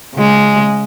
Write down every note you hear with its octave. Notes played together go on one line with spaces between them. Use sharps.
C#3 G#3